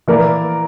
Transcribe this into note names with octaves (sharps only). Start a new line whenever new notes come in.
E3 A#3 E4 A#4 D5